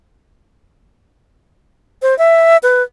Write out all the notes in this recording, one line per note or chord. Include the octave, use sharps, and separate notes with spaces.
C5
E5
B4